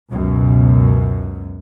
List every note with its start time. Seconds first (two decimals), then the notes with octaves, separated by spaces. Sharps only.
0.11 C#2 F#2 B2